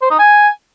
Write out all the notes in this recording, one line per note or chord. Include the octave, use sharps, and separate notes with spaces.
C5
D#4
G#5